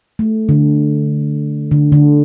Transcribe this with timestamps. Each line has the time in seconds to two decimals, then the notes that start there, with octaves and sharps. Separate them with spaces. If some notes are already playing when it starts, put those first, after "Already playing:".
0.19 A3
0.49 D3
1.71 D3
1.92 D3